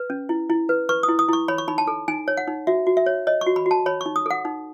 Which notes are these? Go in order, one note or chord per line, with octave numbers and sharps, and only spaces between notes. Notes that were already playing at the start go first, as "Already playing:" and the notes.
Already playing: B4
C#4
E4
E4
B4
B4 C#6
D#6
E4
D#6
E4 C#6
C#5 B5
C#6
D#4 B5
A5
A4
D#4 G#5
C#5
F#5
D#4
F#4 E5
F#4
E5
C#5
C#5 D#5
C#6
F#4
B5
F#4 A5
C#5 B5
C#6
D#4
D#6
A4 F#5
D#4